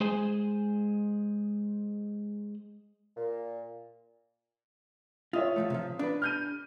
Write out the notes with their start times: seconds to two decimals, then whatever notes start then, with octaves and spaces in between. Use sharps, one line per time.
0.01 G#3 G#4 C5 G#5
3.17 A#2
5.33 F4 C#5 E5 D#6
5.56 A2 F3 A3
5.70 C3 F3
5.99 D4 B4
6.22 F6 G6 D#7